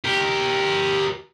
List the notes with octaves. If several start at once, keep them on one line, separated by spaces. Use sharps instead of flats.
G4 A#4